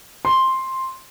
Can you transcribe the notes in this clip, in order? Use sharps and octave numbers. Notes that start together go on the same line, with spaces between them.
C6